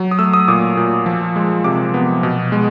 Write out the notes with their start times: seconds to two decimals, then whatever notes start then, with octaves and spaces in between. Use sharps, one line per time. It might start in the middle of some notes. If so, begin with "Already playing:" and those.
Already playing: F#3
0.11 D#6
0.19 A3 E6
0.34 D#6
0.48 A#2 D6
0.77 A#2
1.06 F3
1.36 G#3
1.64 C3 D6
1.94 B3
2.23 B2
2.52 G#3